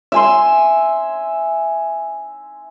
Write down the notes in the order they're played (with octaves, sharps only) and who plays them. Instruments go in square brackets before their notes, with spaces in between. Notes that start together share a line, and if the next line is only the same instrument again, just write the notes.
[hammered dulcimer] E5 G#5 C6